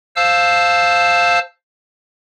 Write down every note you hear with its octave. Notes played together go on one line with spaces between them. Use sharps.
C5 F5 A5 E6